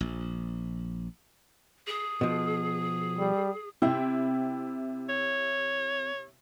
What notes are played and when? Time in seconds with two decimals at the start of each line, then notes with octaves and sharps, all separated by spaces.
0.01 A#1
1.87 G#4
2.21 B2 F3
3.19 G3
3.82 C3 C4 E4 G5
5.09 C#5